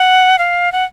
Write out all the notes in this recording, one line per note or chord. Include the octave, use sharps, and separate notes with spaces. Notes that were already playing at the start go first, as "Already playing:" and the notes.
Already playing: F#5
F5
F#5